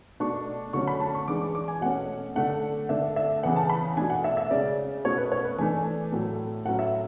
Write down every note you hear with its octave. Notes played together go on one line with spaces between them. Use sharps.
B2 A3 D4 C#6
D3 F#3 A3 C#4 C#6
B5
A5
C#6
E3 G#3 D4 D6
D6
G#5
B2 A3 C#4 F#5
D3 A3 D4 F#5
D3 A3 D4 E5
E5
C#3 E3 B3 F#5
A5
B5
B2 A3 D4 G#5
F#5
E5
E5
C#3 G#3 C#4 D5
B2 A3 C#4 C#5
B4
C#5
B4
E3 A3 D4 G#5
A2 F#3 A3
A2 F#3 C#4 F#5
E5